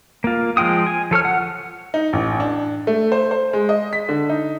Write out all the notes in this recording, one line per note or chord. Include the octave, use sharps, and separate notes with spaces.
A#3 F4
F3 G#3 F4 G5 D#6
G#5
F3 A4 C#5 F6
F#5
D#4
A1
D4
A3
C5
C5
G#3
D#5
B6
D3
D#4